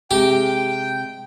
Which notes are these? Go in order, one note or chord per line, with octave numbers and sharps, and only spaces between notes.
C3 G#3 G4 G5